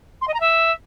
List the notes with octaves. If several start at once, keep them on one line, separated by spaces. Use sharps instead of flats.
C6
D#5
A#5
E5